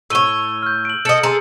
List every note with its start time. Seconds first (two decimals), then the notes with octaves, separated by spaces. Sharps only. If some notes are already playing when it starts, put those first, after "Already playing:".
0.10 A2 C#5 E6 D#7 G7
0.63 F6 G6
0.85 D7 F#7
1.05 A4 D#5 A6 C#7
1.23 G#4 A4 A#5 C6